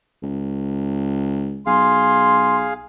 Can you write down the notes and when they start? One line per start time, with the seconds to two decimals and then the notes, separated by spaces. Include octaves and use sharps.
0.22 C#2
1.66 B1 G#4 F5 C6